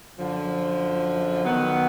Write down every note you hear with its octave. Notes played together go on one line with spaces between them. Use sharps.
F#2 D3 F3
D#3 F#3 B3